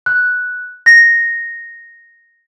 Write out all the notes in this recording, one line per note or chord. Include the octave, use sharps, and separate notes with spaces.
F#6
A#6